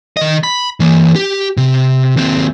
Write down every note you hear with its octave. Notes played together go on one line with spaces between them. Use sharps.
D#3 D#5
B5
E3 A#3
G4
C3
D#2 C4